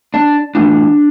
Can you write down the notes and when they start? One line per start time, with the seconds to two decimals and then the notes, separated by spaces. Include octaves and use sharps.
0.14 D4
0.55 A2 E3 D4